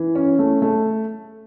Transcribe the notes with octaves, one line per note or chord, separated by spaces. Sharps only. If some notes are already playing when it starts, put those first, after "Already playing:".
Already playing: E3
C#4
A3
A3